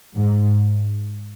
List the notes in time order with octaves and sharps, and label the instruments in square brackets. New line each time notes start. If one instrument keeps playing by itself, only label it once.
[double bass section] G#2